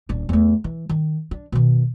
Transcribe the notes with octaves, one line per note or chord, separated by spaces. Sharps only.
D#1 D4
E2 A3
E3
D#3
D4
B2 D#3